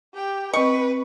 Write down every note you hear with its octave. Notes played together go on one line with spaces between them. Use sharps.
G4 G5
C4 B4 D#5 C#6